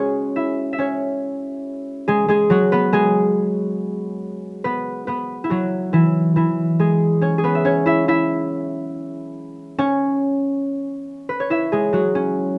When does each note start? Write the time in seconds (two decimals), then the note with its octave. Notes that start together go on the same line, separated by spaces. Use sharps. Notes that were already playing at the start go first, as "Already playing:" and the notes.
Already playing: G#3 C#4 F#4 G#4 C#5
0.36 E4 E5
0.73 E5
0.78 C#4 C#5
2.08 G#3 G#4
2.28 G#3 G#4
2.50 F#3 F#4
2.72 B3 B4
2.93 G#3 G#4
4.64 B3 B4
5.07 B3 B4
5.44 E4
5.50 F#3 F#4
5.93 E3 E4
6.36 E3 E4
6.79 G#3 G#4
7.21 C#4 C#5
7.38 G#4
7.44 B3 B4
7.55 E5
7.65 C#4 C#5
7.86 E4 E5
8.08 E4 E5
9.78 C#4 C#5
11.29 B4
11.40 C#5
11.50 E4 E5
11.72 G#3 G#4
11.93 F#3 F#4
12.15 C#4